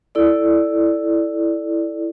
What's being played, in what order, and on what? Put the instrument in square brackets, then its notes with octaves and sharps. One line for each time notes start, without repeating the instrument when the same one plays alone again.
[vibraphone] E4 A4 D5